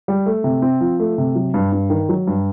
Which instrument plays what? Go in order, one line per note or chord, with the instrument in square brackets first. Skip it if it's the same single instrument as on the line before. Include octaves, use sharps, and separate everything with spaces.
[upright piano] G3
A3
C3
C4
F3
A3
C3
F#3
G2
G2
D#3
F#3
G2